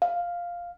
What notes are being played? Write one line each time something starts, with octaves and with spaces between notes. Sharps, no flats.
F5